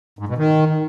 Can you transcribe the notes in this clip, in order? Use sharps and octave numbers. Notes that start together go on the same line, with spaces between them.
G#2
B2
D#3